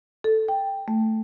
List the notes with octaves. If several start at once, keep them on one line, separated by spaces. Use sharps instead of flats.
A4
G5
A3